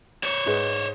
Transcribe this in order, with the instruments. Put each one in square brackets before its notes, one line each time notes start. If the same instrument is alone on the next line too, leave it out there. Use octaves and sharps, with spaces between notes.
[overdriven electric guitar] C5 C#5
[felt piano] G#2 G#4 B4